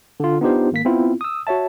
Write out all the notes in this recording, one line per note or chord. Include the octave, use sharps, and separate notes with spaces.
D3 F4
B3 D4 D#4 F4 G4 C5
G#1 A#3 B6
B3 C4 E4 F4
D#6 E6
F#4 C#5 E5 A5